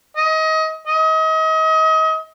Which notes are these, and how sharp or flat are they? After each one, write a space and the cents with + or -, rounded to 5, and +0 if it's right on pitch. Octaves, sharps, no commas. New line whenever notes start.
D#5 +25
D#5 +35